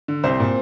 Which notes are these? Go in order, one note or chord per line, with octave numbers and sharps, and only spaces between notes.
D3
C2 C4 C5
A#2